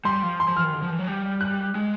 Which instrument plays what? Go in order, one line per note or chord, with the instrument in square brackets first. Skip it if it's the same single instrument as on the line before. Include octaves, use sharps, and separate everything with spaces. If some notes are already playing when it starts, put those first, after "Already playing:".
[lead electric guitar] G3 [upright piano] C6
[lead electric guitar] F3
[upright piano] C6
[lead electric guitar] F3
[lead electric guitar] E3 [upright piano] F6
[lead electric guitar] D#3
D3
F3
E3
F#3
G3
[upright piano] F#6
[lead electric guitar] G#3